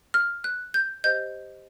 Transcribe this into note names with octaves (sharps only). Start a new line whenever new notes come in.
F6
F#6
G6
G4 C5 D#5 G6